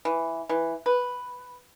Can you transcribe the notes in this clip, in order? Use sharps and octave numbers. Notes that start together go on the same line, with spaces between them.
E3
E3
B4